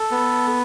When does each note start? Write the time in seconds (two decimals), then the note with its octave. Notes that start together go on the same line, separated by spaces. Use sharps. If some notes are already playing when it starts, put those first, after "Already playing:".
Already playing: A4
0.11 B3